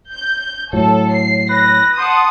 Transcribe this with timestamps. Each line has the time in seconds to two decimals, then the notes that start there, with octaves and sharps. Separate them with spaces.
0.11 G6
0.73 A2 F#3 A4
1.12 C7
1.50 B4 A#6
1.98 F#5 A5 C6 D#6